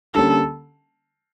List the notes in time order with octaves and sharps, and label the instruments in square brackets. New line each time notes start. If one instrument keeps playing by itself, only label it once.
[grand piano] D3 G3 A#3 C#4 [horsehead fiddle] A4